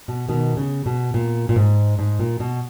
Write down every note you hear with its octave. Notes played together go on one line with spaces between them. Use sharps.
B2
B2 D#3
C#3
B2
A#2
A#2
G#2
G#2
A#2
B2